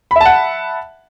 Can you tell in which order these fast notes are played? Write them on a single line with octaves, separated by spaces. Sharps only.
B5 E5 A5 F#5